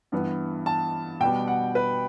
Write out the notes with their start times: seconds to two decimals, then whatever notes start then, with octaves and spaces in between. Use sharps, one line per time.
0.12 G2 E3 B3
0.66 A5
1.20 B2 G3 B3 G5
1.48 F#5
1.75 B4